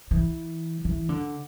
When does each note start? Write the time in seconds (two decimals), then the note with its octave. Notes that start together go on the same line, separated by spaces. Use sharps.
0.11 E3
0.85 E3
1.09 D3